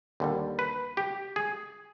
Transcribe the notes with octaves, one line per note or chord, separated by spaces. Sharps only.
D#2 D3 G3
B4
G4
G#4